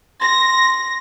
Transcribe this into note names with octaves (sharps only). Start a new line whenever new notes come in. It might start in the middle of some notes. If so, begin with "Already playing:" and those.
C6 A#6